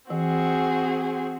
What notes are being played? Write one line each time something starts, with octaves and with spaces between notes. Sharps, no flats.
E3 C4 F#4 G#4